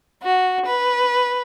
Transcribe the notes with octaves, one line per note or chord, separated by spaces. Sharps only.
F#4
B4